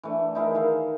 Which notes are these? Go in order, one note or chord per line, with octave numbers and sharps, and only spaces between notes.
E3 A3 D4
D#4 E4 G#4 A#4
D#3 A4 F5